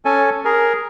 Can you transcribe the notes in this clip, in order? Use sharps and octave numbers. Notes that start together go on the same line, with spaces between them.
C#4 A4 G#5
G#4 A#4